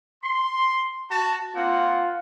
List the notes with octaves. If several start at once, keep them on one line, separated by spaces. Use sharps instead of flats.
C6
F#4 A5
A#3 C4 F4 F#5